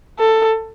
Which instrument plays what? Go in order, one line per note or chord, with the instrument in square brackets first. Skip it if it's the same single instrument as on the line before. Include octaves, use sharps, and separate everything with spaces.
[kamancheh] A4